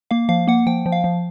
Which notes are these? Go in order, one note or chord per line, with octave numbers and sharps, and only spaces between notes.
A#3 F5
F3 F5
A#3 F#5
F3 G5
F3
F5
F3